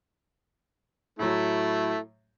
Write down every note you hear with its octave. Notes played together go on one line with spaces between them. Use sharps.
A2 F#3 A3 E4